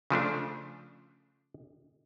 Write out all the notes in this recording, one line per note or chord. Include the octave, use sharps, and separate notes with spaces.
C#3 F3 A3 D4